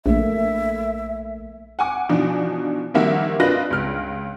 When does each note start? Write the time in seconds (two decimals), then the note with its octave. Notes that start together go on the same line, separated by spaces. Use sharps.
0.06 A#1 A3 A#3 E5
1.79 F#5 G#5 D6
2.09 B2 E3 F3 D4 D#4
2.94 A#1 D#3 G3 A#3 E5 F#5
3.40 D4 F4 B4 D#5 F#6 A#6
3.70 C#2 F6